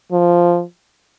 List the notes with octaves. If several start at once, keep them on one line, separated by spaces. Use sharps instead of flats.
F3